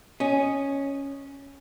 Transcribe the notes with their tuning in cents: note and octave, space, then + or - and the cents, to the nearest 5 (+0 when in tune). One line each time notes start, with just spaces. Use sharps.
C#4 +0 D#5 -10